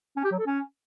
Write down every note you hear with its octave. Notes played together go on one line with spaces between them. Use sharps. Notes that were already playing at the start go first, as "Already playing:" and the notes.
C#4
G4
F#3
A4
C#4